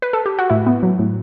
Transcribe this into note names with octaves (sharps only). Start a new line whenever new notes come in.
B4
A4
G4
F#4
A2 E4
B3
F#3
A2